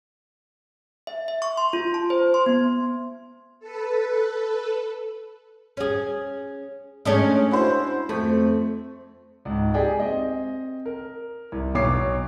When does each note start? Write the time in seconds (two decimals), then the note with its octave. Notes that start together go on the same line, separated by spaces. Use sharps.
1.07 E5
1.28 E5
1.42 C#6
1.57 C6
1.73 F4
1.94 A5
2.10 C5
2.34 C6
2.46 B3
3.60 A4 B4
5.77 C#4 G#4
7.05 G#3 A3 C#4 D4 D#5
7.51 E4 F#4 C5
8.09 F2 A3
9.45 C#2 G#2
9.74 G4 G#4 D5 G5
10.00 C4 D#5
10.86 A#4
11.52 C2
11.75 B1 B2 C#5 D6 C7